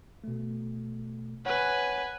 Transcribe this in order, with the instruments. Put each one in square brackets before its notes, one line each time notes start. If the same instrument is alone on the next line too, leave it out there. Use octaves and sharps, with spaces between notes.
[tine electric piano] B2 A3
[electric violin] B4 G#5 [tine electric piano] C#5 F#5